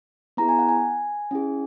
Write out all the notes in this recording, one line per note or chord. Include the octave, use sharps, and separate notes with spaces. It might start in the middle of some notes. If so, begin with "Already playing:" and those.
B3 E4 G#4 A#5
G#5
F#5
G#5
C#4 E4 G#4